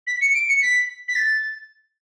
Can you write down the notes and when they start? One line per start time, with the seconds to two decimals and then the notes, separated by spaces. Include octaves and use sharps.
0.07 B6
0.21 C#7
0.34 D7
0.48 C#7
0.62 B6
1.08 B6
1.15 A6